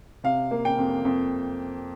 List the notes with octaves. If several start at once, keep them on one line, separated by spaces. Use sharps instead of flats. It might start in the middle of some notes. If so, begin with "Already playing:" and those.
C3 F5
A#3
G5
F2
F2